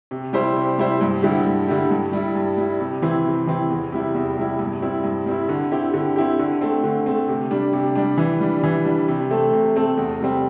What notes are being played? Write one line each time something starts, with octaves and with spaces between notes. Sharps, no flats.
C3
G3 E4 G4 C5
C3
G3 E4 G4 C5
G2
D3 G3 E4 G4
G2
D3 G3 E4 G4
G2
G3 E4
G2
G3 E4
C3
E3 C4 E4
C3
E3 C4 E4
E2
C3 G3 E4
E2
C3 G3 E4
G2
G3 C4 E4
G2
G3 C4 E4
D3
C4 E4 G4
D3
C4 E4 G4
D3
A3 C4
D3
A3 C4
C3
G3 D4
C3
G3 D4
E3
G3 D4
E3
G3 D4
C3
A3 C4 A4
C3
A3 C4 A4
E2
C3 G3 C4